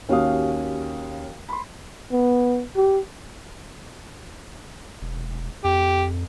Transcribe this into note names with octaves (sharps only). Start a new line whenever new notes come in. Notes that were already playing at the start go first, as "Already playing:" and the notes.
D#2 C#4 F#4 G4 F5 D#6
B5 C6
B3
G4
E1
F2 G4